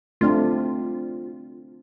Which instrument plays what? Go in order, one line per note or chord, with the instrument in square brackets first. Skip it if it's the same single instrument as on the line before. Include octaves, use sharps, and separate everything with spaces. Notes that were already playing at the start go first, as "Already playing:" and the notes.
[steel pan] A3 C4 D4 [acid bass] F4